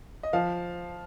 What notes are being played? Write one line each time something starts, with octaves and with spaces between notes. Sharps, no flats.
D#5
F3 F5